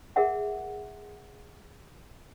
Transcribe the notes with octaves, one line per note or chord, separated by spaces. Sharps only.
G#4 A#4 E5 F#5